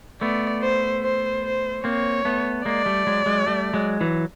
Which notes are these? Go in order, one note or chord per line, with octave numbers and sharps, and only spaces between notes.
A3 B3 D5
C5
C5
C5
A#3 C4 C#5
A3 B3
G#3 A#3 D5
G3 A3
F#3 G#3
F#3 G#3
G3 A3
F#3 G#3
E3 F#3